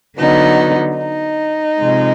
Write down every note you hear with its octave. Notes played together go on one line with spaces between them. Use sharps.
D3 F#3 B3 D#4
D#4
C3 F3 G#3